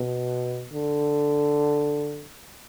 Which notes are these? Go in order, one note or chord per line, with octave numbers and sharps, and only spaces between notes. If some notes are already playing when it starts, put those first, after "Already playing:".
Already playing: B2
D3